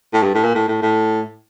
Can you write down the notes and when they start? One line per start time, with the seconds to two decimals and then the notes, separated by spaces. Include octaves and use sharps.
0.13 A2
0.23 G2
0.34 A2
0.44 A#2
0.55 A2
0.68 A2
0.82 A2